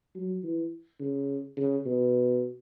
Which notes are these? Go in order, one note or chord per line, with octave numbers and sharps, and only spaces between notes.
F#3
E3
C#3
C#3
B2